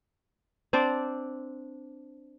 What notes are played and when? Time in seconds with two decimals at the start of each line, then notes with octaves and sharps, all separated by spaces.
0.73 C4 D4 C5 D5